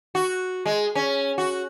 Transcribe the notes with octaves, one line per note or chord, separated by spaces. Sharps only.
F#4
G#3
C#4
F#4